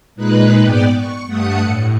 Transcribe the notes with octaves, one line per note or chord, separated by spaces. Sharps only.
A#2 G#3 D#4 B4 F#6
G#2 B3 D5 G5 F#6
C#6
G2 A3 F#5 D#6 C#7
A2